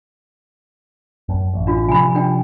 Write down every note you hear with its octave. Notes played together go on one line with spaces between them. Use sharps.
F#2
A1
D4 F4
C3 F3 G3 G#5 B5
D4 G5